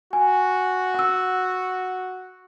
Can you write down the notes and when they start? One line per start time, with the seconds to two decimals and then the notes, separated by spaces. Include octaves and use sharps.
0.13 F#4 G#5
0.94 F#5 E6